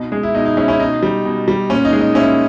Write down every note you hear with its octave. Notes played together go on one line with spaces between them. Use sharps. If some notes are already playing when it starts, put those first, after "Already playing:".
Already playing: B2 D#4
G#3
E4
B2 D#4
D#4
G#3 C#4 E4
C#4 E4
B2 D#4
G3
B2
G3
A#2 C#4
D#4
G#3
D#4
A#2 C#4 E4